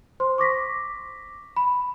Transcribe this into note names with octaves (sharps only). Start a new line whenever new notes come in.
C5 C6
C#6 D6 A#6 B6
B5